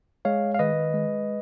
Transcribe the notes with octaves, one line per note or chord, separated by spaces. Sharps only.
G#3 C#5 F5
F5
D#3 B4 D#5
G#3